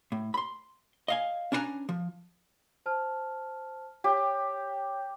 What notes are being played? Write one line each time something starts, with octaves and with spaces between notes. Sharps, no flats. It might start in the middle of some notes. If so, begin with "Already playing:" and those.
A2
B5 C6
D#5 F5 G#5
C#4 D4 E4 B4 G#5 A#5
F3
C5 A5 F6
G4 C#5 G5